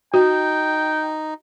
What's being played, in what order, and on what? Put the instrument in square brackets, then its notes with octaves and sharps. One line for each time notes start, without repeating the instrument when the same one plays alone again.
[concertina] D#4 [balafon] F#4 [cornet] G5